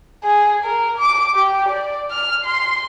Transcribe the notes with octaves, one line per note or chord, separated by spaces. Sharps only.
G#4
A#4
D6
G4
D5
F6
C6